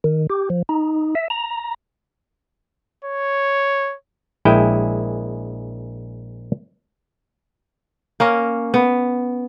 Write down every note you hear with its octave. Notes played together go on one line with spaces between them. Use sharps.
D#3
G4
F3
D#4
E5
A#5
C#5
A#1 G#3 E4 G5
A#3 C#4 A#4
B3